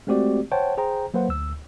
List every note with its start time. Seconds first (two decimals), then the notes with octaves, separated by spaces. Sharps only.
0.07 G#3 A3 C4 F#4 G4 D5
0.52 C5 C#5 F#5 G5 A5
0.78 G#4 C5 G5 A#5
1.14 F#3 A#3 B4 C5 F#5
1.29 D2 E6